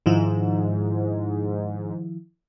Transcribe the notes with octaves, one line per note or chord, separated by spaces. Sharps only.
G#2 D#3 F3 E4